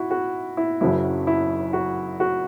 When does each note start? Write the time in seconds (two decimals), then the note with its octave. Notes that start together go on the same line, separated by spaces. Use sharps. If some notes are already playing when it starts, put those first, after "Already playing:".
Already playing: E4 F#4
0.11 F#4
0.57 E4
0.81 F#1 F#2 C#3 F#3 E4
1.27 E4
1.73 F#4
2.20 F#4